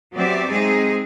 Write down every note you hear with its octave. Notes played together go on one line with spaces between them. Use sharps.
F#3 B3 C4 G4 D5 E5
G#3 C4 D#4 G#4